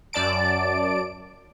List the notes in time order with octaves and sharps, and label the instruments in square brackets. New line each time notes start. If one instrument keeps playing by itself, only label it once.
[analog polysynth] F#2 D5 A5 D7